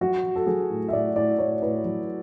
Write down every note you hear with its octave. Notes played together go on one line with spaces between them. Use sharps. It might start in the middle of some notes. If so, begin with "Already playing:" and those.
F#3 F#4
F#3
A4
F#3 G#4
A2
E5
A2 D5
A2 D5
A2 C#5
A2 B4
F#3